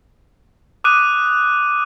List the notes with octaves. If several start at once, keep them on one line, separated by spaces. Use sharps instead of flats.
D6 D#6 F#6 D#7